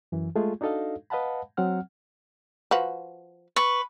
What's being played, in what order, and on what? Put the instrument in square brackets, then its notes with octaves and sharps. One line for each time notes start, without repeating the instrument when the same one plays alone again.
[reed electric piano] F#2 E3
G#3 A3 F4 G#4
D4 D#4 F#4 A4 D#5 F5
B4 D#5 F5 F#5 A5 B5
F#3 C4 F#5 F6
[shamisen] F3 F#4 B4
[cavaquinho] B4 C#6